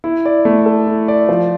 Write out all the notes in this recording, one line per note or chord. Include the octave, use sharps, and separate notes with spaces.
E4
D5
A3
A4
E4
D5
F3